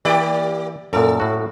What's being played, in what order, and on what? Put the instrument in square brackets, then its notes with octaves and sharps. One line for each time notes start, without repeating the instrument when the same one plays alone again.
[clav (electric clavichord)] E3 [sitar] A#3 G4 D5
[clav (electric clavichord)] F#2 A#2 [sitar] A4
[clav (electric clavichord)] A2 F#4